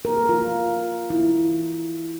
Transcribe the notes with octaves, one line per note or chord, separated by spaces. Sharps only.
A#4
F4
E4